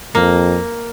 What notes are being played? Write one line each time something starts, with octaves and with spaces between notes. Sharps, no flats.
F2 A#3